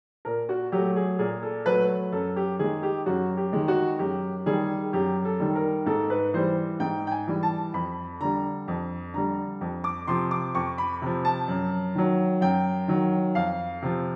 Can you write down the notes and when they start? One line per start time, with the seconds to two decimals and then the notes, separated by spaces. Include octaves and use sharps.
0.25 A#2 A#4
0.49 F#4
0.72 F#3 A3 G4
0.96 G#4
1.19 A#2 G#4
1.43 A4
1.66 F#3 A3 B4
2.12 F#2 A4
2.36 G4
2.59 D#3 G#3 G#4
2.83 G4
3.06 F#2 F#4
3.37 G4
3.53 D#3 G#3
3.68 F#4
3.99 F#2 G4
4.46 D#3 G3 G#4
4.93 F#2 G4
5.25 A4
5.40 D#3 G3
5.55 A#4
5.86 G#2 A4
6.10 B4
6.34 E3 G3 C5
6.80 G#2 G5
7.07 G5
7.11 G#5
7.27 E3 G3
7.43 A5
7.74 F2 B5
8.20 D3 G3 A#5
8.68 F2
9.14 D3 G3 A#5
9.61 F2
9.84 D6
10.07 C3 F3 C6
10.31 D6
10.55 F2 C#6
10.78 B5
11.02 C3 F3
11.25 A5
11.48 F#2
11.95 D#3 F#3
12.41 F#2 G5
12.88 D#3 F#3
13.35 F2 F5
13.82 C3 F3